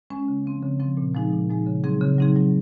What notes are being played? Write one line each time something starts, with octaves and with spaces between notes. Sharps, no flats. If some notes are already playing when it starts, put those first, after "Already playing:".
G#3 C#4
C#3
F3 C4
C#3
F3 C4
A#2
F3 G#3 D#4 G#4
A#2
F3 G#3 D#4 G#4
C#3
F#3 C4 D#4 G#4
C#3
F#3 C4 D#4 G#4
F#3